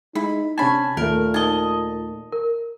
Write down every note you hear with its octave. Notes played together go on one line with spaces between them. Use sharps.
G#3 D#4 E4 B5
C3 C#4 D4 G#5 A5 B5
D#2 A#2 A3 A#4
D#4 D#5 A5 G7
A#4